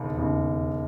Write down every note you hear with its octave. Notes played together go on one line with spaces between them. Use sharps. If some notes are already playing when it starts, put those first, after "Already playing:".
Already playing: E1 D#2 C#3
E1 D#2 C#3